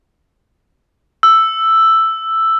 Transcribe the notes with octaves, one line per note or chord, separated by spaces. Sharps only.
E6